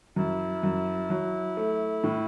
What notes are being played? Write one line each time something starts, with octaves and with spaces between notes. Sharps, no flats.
F#2 E4
F#2
F#3
A3
A2